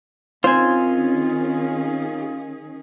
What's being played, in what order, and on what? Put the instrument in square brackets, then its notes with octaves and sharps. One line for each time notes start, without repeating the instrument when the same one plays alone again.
[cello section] D#3 C#4 G#4 [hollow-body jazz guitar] C4 C5 [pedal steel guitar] F4 G#5